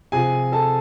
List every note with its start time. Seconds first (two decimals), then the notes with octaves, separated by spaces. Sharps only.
0.12 C3 F3 G#4 G#5
0.52 A4 A5